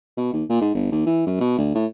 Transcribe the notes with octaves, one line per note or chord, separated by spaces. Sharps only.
B2
D#2
A#2
G#2
G1
D#2
E3
F#2
B2
D2
A2